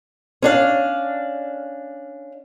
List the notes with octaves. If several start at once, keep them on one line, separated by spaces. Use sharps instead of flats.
C#4 D4 F5